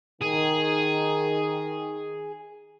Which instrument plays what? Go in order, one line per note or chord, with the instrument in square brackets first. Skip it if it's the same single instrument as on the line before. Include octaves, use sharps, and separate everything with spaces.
[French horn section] D#3 [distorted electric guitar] G#4